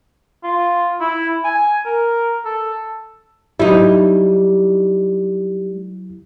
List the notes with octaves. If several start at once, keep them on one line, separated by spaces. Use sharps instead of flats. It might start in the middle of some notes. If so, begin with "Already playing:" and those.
F4
E4
G#5
A#4
A4
F#3 G3 D#4 E4